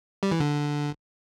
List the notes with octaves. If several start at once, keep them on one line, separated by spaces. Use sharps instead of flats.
G3
E3
D3